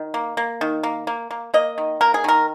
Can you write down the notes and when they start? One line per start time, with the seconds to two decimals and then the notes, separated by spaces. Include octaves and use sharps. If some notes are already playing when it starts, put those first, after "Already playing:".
Already playing: D#3
0.14 A#3
0.37 A#3
0.61 D#3
0.83 A#3
1.07 A#3
1.31 A#3
1.54 A#3 D#5
1.78 D#3
2.01 A#3 A#4
2.14 G#4
2.24 D#3 A#4